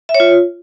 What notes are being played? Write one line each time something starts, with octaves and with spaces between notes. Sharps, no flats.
E5
C#5
F4